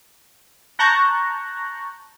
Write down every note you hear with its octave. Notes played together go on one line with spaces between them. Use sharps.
A5 A#5 C#6 F#6 G6 A#6